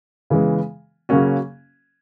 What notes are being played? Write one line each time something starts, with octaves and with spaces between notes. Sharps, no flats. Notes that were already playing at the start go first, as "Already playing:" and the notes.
C#3 E3 G#3 B3
C#3 F#3 A#3 C#4 F#4